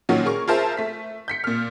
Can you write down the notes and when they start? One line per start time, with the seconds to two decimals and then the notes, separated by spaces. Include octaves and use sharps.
0.09 A#2 D#3 F#3 C#4 F4 F#4
0.25 G#4 A#4 C#6
0.48 F4 G#4 A#4 C5 E5 A5
0.77 A3 B6
1.28 G6 B6 C#7
1.44 A#2 F6